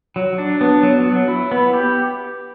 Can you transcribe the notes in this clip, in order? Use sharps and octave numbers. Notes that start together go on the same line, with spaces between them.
F#3
D4
B3
F#3
F#3
E4
B3
G4